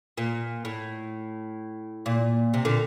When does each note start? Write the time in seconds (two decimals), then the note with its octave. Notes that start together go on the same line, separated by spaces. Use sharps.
0.17 A#2
0.65 A2
2.06 A#2
2.54 C3
2.65 A#2 D3